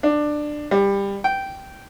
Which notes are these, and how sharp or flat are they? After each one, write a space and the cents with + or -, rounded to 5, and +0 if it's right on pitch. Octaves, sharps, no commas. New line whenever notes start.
D4 +15
G3 +20
G5 -10